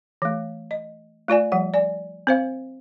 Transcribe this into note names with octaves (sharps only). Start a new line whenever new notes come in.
E3 A3
D#5
A3 F4 D5 G#5
F3 G3 F#5
D5 G#5
C4 C5 F5